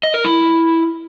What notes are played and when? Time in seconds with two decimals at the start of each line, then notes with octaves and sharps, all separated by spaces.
0.03 D#5
0.14 A#4
0.25 E4